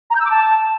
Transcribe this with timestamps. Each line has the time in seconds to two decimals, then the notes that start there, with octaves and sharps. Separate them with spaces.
0.10 A#5
0.15 G6
0.20 E6
0.25 D6
0.30 A5